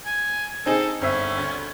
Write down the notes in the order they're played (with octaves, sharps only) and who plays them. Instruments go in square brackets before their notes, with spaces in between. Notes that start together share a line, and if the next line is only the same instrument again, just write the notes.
[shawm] G#5
[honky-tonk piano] C4 D#4 G#4 [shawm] A4
[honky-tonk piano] G1 C4 E5 [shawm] C#4
[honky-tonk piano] D2